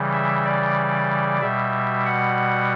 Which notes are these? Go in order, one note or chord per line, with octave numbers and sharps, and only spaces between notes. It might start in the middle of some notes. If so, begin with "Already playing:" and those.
Already playing: C#3 E3 G3
E5
D5
B2 G3 E5
F#5